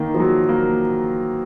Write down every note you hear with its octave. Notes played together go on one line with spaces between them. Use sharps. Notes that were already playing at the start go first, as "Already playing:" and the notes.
Already playing: D#3 A#3
F3
F#3
A#3